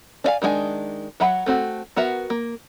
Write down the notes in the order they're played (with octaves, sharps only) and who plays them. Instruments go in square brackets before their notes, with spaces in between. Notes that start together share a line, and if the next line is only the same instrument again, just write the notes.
[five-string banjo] D4 D5 F5 G#5
D#3 G#3 B3 D4 G#5
F#3 E5 F#5 B5
A3 C4 F#4
B3 F#4 A#4 E5
A#3